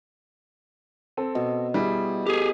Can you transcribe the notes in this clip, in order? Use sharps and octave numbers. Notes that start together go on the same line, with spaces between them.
C4 A4
B2
G3 E4 G#4
G4 G#4